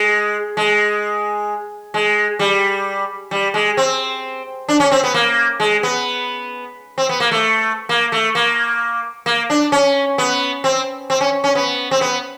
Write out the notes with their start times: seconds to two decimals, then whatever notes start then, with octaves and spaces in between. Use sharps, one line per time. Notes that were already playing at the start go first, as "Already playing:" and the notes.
Already playing: G#3
0.57 G#3
1.94 G#3
2.39 G3
3.31 G3
3.54 G#3
3.77 C4
4.69 D4
4.80 C#4
4.91 C4
5.04 B3
5.14 A#3
5.60 G#3
5.83 B3
6.98 C4
7.09 B3
7.20 A#3
7.32 A3
7.89 A#3
8.12 A3
8.35 A#3
9.26 A#3
9.50 D4
9.72 C#4
10.18 B3
10.64 C4
11.10 C4
11.21 C#4
11.44 C#4
11.55 B3
11.91 C4
12.01 B3